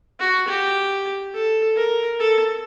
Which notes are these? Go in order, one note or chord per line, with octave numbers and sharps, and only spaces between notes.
F#4
G4
A4
A#4
A4